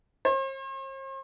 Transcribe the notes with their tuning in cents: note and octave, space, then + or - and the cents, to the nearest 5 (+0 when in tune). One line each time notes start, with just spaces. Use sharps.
C5 +45